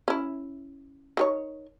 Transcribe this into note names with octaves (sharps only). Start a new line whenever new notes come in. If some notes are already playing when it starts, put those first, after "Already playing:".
C#4 E4
D#3 G#4 C#5